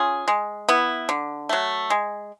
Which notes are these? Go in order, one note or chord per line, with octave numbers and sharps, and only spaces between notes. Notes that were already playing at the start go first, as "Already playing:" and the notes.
Already playing: C#4 F4 G#4
G#3
B3 E4
D3
F#3 A3
G#3